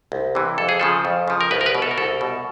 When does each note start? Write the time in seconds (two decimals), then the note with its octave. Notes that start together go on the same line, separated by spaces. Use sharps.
0.12 C2
0.35 C3 E3
0.58 F2 A4
0.69 G#4
0.79 C#3 F3 A4
1.05 F2
1.28 C#3 F3
1.41 A#4
1.51 C2 B4
1.61 A#4
1.66 B4
1.75 B2
1.82 A4
1.91 A#4
1.98 C2 A4
2.21 B2